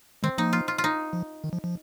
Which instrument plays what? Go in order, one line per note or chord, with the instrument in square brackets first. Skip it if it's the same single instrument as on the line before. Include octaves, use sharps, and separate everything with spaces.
[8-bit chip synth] D#3 G#3 [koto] C4
[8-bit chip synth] F3 A#3 [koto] D#4
[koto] F4
F4
F4
D#4
[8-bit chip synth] F3
D#3
F3
F3